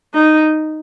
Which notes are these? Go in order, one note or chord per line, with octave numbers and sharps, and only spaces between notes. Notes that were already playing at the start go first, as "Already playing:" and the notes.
D#4